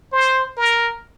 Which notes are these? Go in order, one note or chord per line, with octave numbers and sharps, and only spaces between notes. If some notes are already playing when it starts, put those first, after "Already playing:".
C5
A#4